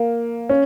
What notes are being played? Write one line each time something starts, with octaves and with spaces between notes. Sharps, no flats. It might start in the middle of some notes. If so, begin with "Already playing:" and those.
Already playing: A#3
C#4